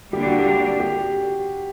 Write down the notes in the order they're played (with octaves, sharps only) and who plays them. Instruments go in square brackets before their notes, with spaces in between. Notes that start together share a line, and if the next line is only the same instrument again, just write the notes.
[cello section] D3 G3 A#3 D4 [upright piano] G4
[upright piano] F#4
G4
G4